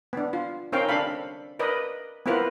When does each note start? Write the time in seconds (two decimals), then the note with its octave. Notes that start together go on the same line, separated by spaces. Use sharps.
0.13 B3 D4
0.33 F4
0.72 C4 C#4 D#4 A#4 F5 G5
0.89 D4 A4 F5 B5
1.59 A#4 B4 D5 D#5
2.26 B3 C4 E4 F4 A#4 B4